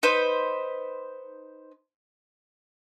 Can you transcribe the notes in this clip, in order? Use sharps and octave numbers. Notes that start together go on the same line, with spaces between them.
D#4 B4 C5 B5